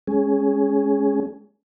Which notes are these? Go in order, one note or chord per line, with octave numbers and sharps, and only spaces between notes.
G#3 C#4 G#4